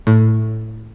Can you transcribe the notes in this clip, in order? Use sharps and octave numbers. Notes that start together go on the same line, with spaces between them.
A2